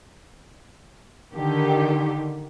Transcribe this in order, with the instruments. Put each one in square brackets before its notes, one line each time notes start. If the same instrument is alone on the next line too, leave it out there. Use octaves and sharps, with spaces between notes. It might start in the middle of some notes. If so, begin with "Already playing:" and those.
[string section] D3 D#3 G4